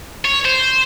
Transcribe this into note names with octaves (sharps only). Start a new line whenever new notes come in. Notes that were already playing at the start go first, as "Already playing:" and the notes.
C#5
C5